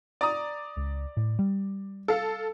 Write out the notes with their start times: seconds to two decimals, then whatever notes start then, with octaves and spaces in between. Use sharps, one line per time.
0.21 D5 A#5 D#6
0.77 C#2
1.17 A2
1.39 G3
2.08 A4 F5